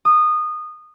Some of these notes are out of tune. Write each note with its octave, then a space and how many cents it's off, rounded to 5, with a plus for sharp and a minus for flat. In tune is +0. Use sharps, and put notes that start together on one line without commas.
D#6 -20